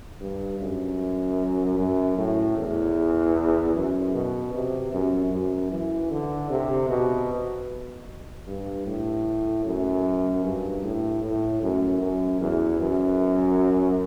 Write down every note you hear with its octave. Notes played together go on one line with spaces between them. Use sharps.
G2
F#2
F#2
A2
E2
F#2
B2
C3
F#2
F#2
E3
D3
C3
B2
G2
A2
F#2
G2
A2
A2
F#2
F#2
E2
F#2